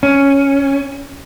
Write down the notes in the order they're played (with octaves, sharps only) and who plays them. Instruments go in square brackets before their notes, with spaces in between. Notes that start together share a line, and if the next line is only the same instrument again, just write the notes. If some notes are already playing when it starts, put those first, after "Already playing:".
[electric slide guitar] C#4